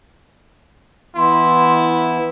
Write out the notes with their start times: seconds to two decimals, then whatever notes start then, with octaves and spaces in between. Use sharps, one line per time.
1.16 E3 B3 E4 C6